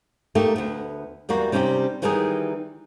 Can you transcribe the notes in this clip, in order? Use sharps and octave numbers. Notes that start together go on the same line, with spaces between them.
A3 A#3 D#4 G4
D2 B3
E2 G3 A#3 F#4
C3 G3 C#4 D#4 E4 G4
D#3 E3 G3 B3 D#4 G#4